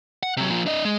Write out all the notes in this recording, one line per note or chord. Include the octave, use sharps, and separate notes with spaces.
F#5
C3 F#3
A#2 F3
D4 D#5
G#3